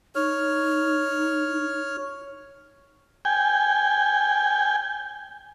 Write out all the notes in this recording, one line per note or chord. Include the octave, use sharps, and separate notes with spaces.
D#4 C#5 F6
G5 G#5